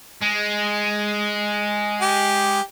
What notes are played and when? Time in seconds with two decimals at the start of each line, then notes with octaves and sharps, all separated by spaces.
0.22 G#3
2.01 G4